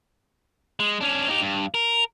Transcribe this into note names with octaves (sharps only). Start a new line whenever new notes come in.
G#3
C#4 D4
D#4 G4
G2
A#4